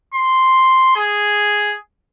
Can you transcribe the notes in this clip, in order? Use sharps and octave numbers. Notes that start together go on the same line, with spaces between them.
C6
G#4